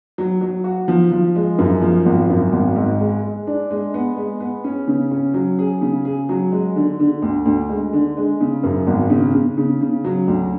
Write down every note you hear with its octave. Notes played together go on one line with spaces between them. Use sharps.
F#3
F#3
F#4
F3
F3
G#3
F#2
F3
G#1
F#2
G#1
G#2
G#3
G#3
D4
G#3
B3
G#3
B3
C#4
C#3
C#4
F#3
G#4
C#3
G#4
F#3
G#3
D3
D3
D2
D2
G#3
D3
G#3
C#3
F#2
G#1
C#3
C#3
C#3
C#3
F#3
D2